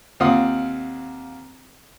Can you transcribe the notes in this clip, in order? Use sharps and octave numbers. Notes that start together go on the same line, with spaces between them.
D#2 C4 F4 F#5 D#6 F6